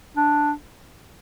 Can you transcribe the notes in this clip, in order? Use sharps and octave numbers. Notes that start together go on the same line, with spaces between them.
D4